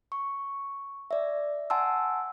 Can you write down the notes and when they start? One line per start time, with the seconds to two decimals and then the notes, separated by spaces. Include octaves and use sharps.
0.12 C#6
1.11 D5 E5
1.70 F#5 G#5 A5 C6 E6